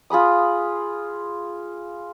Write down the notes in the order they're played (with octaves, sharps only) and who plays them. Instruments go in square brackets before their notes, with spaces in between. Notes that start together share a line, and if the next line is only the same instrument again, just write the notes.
[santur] F4 G#4 B5 D#6